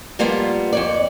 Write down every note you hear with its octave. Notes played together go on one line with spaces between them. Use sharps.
F3 G3 A#3 B3 F4
F2 C#5 D5